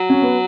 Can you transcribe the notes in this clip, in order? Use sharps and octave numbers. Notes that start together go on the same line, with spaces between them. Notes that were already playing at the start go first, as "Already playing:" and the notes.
Already playing: F#3
C#4
B3